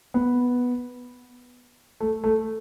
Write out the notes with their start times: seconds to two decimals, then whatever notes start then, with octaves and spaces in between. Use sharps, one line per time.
0.14 B3
2.00 A3
2.24 A3